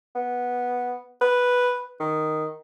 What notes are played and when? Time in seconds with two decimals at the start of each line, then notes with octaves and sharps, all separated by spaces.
0.15 B3
1.21 B4
2.00 D#3